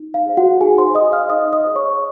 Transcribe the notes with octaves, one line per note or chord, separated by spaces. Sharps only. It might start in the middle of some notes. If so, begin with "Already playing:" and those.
Already playing: D#4
F5
G#4 C5
F#4 F#5
D#4 G#4 G#5
C5 C6
G#4 C5 D#5 D#6
F5 F6
D#4 D#5 D#6
D#5 D#6
G#4 C5
C#5 C#6